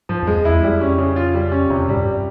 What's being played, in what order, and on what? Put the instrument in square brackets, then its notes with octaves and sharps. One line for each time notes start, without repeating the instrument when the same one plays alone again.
[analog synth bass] G#2 [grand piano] F3
[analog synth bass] F2 [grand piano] G#3
[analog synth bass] E2
[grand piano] E4
[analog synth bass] F2
[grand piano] G3
C#4
C#3
F4
G3
C#4
[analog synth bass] F2 [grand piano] C3
[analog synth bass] G#2 [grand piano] G3
[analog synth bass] G2